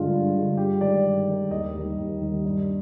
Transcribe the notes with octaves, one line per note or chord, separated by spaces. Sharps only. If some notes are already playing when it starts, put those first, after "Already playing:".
Already playing: G2 D3 G#3 F4
G2
D3 G#3
G2 G4
D#3 G#3 D5
G2
D#3 G#3
D#2 D#5
D#3 G3
D#2
D#3 G3
G2